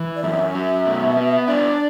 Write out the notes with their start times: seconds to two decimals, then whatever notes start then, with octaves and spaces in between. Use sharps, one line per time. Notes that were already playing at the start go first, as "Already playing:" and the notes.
Already playing: E3
0.16 D5
0.23 F#2 E5
0.55 F#3
0.86 B2
1.17 B3
1.48 D4 D5